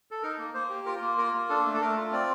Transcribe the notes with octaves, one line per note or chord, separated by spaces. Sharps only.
A4
D#4 A#4
A#3
A#3 C5
G4
F4 A#4
A#3
F4 A#4
A#3
D4 A4
A3
A4
A3 A#4
F4
C4 D5